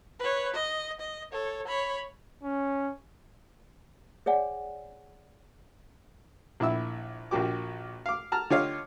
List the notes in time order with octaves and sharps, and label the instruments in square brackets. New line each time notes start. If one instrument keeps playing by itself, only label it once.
[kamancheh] B4 C#5
D#5
D#5
A4 C#5
C#5 B5
[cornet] C#4
[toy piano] G#4 C#5 D5 F#5 G#5
[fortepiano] A#1 E4 E5 E6
A#1 A#2 A#3 F#4 G4 D6
F5 D6
A5 A#5 F6
D3 F4 G4 C#5 D#5 F5